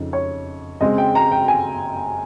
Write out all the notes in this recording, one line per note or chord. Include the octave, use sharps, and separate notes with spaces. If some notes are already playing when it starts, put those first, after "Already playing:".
Already playing: F2 C#3 D#4
C#5
C#3 G#3 C4 D#5
G5
A#5
G5
G#5